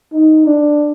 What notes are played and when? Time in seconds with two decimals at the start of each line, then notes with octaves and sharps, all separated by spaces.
0.13 D#4
0.47 D4